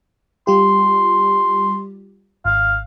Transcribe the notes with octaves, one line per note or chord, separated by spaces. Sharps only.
G3 F4 G4 C6
G#1 F5